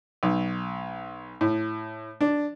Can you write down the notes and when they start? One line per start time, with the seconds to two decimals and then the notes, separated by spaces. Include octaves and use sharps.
0.23 B1
1.41 A2
2.21 D4